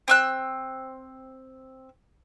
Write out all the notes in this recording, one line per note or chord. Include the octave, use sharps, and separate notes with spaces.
C4 E6 F#6